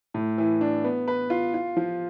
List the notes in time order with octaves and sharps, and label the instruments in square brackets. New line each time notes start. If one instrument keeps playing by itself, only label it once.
[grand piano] A2
E3
D4
B3
B4
F4
F4
F3